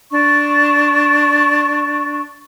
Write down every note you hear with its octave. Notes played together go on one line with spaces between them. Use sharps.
D4 C#6